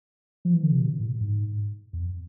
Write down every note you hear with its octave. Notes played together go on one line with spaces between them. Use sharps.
F3
E3
D3
C3
B2
A2
G#2
E2
F2